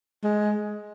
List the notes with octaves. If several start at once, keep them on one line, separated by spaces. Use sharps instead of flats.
G#3